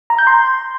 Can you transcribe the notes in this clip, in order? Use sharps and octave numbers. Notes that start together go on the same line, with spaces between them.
A#5
G6
C6